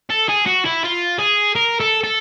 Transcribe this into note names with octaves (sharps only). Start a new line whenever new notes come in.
A4
G#4
F#4
E4
F4
G#4
A#4
A4
A4